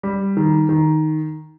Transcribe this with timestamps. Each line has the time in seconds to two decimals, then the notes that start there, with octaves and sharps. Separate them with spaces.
0.03 G3
0.37 D#3
0.69 D#3